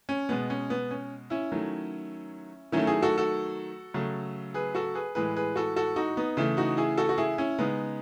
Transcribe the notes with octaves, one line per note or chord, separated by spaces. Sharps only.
C#4
B2 G#3 B3
C#4
B3
C#4
C#4 E4
D#3 F#3 A3
D#3 F#3 A3 C#4 E4
E4 G#4
F#4 A4
F#4 A4
C#3 F#3 A3
G#4 B4
F#4 A4
G#4 B4
A2 E3 G#3 G#4 B4
G#4 B4
F#4 A4
F#4 A4
D#4 F#4
B3 D#4
C#3 E3 A3
D#4 F#4
E4 G#4
F#4 A4
F#4
E4 G#4
C#4 E4
C#3 G#3 B3 D#4